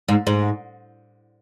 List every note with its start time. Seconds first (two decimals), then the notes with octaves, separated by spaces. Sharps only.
0.08 G#2
0.27 G#2